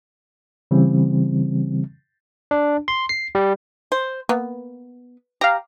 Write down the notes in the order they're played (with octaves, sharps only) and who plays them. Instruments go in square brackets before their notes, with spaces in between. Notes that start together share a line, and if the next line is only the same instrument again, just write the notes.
[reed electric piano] C#3 E3 G3 C4
[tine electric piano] D4
C6
C7
G3
[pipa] C5
[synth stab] A#3 [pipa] B3
[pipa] G4 [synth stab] F5 A#5